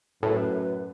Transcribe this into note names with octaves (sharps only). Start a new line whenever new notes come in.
F#2 A2 B4